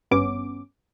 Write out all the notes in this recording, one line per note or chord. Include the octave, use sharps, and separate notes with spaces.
G#1 G2 B3 C#4 D6